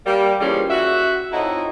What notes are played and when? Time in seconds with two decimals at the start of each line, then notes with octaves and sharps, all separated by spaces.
0.06 G3 A#3
0.41 E3 F3 G3 A#3 C#4 G#4
0.70 F#4 E5
1.32 F2 D#4 E4 C#5 D#5 F#5